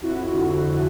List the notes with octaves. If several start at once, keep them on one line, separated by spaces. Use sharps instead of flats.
F2 E4 F#4
F2
D3
F2